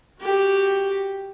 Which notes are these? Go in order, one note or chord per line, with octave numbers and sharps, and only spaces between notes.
F#4 G4